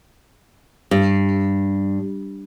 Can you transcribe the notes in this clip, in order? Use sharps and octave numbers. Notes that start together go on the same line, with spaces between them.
G2